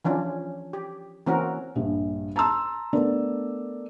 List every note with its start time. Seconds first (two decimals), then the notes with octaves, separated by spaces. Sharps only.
0.05 E3 F3 C#4 D4
0.73 G4
1.26 E3 A#3 C4 C#4 F#4 A#4
1.75 A#1 G2 G3
2.36 A5 A#5 C6 E6
2.93 A3 B3 D4 A#4 D5